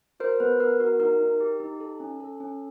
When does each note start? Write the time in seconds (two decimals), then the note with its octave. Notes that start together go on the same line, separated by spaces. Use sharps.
0.20 F#4 A#4 C5
0.40 B3 B4
0.60 B3 A#4
0.80 F#4 A#4
1.00 D#4 A#4
1.20 D#4
1.40 G4
1.60 D#4
1.80 A4
2.00 C#4
2.20 A4
2.40 C#4